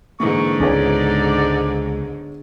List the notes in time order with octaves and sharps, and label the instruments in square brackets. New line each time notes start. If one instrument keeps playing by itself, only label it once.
[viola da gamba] G#2 D3 [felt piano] E3 A#3 [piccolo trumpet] C#6
[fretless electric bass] C#2 C#4 [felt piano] B3 G#4 C#5 [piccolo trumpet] D5